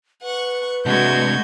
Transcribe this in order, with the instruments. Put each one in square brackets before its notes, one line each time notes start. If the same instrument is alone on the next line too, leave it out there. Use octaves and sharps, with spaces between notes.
[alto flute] B4 [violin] F#5 C#6
[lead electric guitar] C3 D4 [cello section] G#3 A3 F#4 [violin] G6 G#6